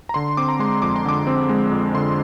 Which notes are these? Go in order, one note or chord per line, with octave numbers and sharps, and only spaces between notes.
A#5
D3 C6
C4 D6
A#5
G#3 C6
F2 D6
C6
D3 D6
C4
G#3
F2
D3 C6